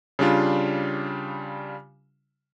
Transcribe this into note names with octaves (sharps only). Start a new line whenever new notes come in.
C#3 G3 D4 F4